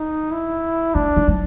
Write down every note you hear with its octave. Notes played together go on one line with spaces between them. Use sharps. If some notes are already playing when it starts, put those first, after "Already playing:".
Already playing: D#4
E4
A3 D4
G#3
F#3